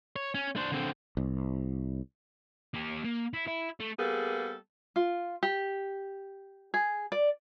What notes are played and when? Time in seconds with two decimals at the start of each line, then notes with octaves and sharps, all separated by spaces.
0.16 C#5
0.35 C#4
0.56 D4 C5
0.72 D3 C4
1.17 C2
2.74 A#3 G4
3.04 A#3
3.33 E4
3.47 E4
3.80 A3
3.99 G3 A#3 B3 G#4 A4
4.96 F4
5.43 G4
6.74 G#4
7.12 D5